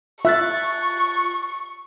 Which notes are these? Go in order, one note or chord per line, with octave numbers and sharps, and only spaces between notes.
F4 E5 C#6 F#6 A6